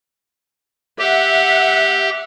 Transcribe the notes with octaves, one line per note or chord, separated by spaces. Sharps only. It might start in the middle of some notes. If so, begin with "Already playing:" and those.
G4 E5 F#5